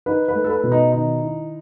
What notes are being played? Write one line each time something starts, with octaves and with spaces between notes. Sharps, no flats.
D#4 B4
B4
A3
A4
B4
B2
D#4
D#3 D#4
E4